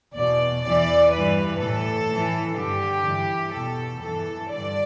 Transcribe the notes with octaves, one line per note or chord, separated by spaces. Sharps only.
E2 B2 D5
E2 E3 D5
G2 E3 B4
A2 E3 A4
A2 E3
G2 D3 G4
G2 E3
E2 B2 A4
G2 E3 A4
G2 D3 D5